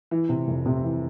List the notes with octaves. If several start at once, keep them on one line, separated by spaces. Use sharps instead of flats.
E3
C3
F1
C3
E3